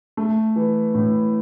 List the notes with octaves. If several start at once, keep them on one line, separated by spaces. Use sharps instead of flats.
A3
E3
A2